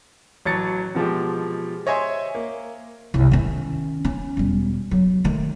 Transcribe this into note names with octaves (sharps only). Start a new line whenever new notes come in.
A1 F#3 A5 A6 C#7
B2 F3 G#3 G4
C5 C#5 D#5 E5 G#5 C6
A#3
C2
D#3 C#4
C#4
E1 G3
F#3
D#3 A3